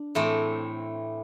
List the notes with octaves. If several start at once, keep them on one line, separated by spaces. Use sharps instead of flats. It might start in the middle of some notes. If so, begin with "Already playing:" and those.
Already playing: D4
A2 E3 A3 C4